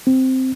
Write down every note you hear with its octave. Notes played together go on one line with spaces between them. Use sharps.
C4